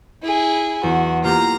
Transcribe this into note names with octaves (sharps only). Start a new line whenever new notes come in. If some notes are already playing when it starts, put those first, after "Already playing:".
E4 G#4
E2 F#4
A#3 F4 G4 A#5